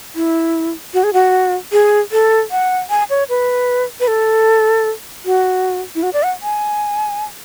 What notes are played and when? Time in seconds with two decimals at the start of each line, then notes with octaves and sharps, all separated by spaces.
0.15 E4
0.94 F#4
1.04 G#4
1.13 F#4
1.72 G#4
2.12 A4
2.51 F#5
2.90 G#5
3.10 C#5
3.29 B4
4.00 B4
4.08 A4
5.25 F#4
5.95 E4
6.03 F#4
6.13 D5
6.23 F#5
6.43 G#5